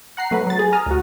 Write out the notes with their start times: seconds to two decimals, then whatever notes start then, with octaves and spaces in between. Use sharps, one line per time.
0.17 F#5 A#5 C7
0.31 F#3 A3 B4
0.47 F#3 A6
0.59 G#4
0.73 A#5 D#6 F6
0.86 D2 F#4